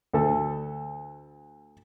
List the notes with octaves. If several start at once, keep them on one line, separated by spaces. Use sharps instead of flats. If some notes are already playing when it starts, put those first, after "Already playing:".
D2 A4